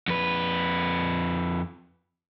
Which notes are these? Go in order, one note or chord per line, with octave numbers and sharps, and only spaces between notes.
F2 B4